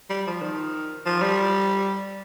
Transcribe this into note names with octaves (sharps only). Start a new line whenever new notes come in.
G3
F3
D#3
F3
G3